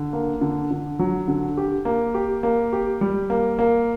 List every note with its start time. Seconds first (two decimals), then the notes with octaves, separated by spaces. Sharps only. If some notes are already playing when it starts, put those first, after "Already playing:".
Already playing: D3
0.13 A#3
0.41 D3
0.71 D3
0.99 F#3
1.28 D3
1.57 G4
1.85 A#3
2.14 G4
2.43 A#3
2.73 G4
3.01 G3
3.30 A#3
3.59 A#3